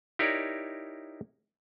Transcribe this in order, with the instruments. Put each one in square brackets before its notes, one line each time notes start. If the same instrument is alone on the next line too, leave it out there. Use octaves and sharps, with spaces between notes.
[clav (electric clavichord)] D#4 E4 G4 A#4 C#5 D5